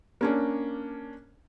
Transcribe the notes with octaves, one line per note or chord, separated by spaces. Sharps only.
A#3 C#4 D4